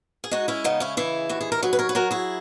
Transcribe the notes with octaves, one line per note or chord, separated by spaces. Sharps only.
G#4
G#3 D#4 F#4
C#4 E4
C#3 B3 D#4
C#4 E4
E3 E4 G#4
D#2 F#4
G#4
A#4
F#3 G#4 B4
B4
A#4 C#5
B4
F#3 F#4 A#4
E4 G#4